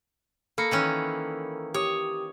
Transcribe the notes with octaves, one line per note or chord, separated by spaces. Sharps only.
A#3 A4 B5 C#7
D#3 E3 C#4
G4 C#5 D#6